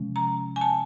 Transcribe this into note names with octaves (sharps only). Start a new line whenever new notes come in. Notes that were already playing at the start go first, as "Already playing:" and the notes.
Already playing: C3 F3 G#3 C#4
A#5
G#5
A5